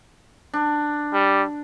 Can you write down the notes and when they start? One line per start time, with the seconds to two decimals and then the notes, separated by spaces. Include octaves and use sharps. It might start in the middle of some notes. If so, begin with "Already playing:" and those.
0.53 D4
1.13 G3